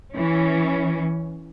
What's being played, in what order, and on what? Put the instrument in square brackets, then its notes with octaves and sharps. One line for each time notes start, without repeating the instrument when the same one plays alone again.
[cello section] E3 C#4